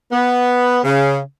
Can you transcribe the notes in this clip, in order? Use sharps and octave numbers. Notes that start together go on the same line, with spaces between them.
B3
C#3